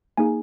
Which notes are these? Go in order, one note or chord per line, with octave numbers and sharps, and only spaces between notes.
A#3 D#4 G#4 G#5